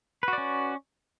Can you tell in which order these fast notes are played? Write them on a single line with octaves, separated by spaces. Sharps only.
B4 F#4 D5 C#4